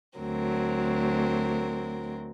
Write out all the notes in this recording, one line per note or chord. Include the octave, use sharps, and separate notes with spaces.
D2 F#3 C4 A#4